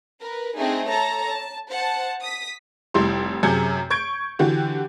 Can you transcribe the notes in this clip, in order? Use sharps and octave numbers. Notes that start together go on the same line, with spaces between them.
A#4 B4
A3 C4 D4 D#4 G#4
A4 C#5 A5 A#5
A5
C5 F#5 A5
D#6 B6
F1 G3 E4 G4 C6
F#2 C3 G#4 G6 G#6 C#7
C#6 G6 G#6 D7
D3 E3 F#4 G4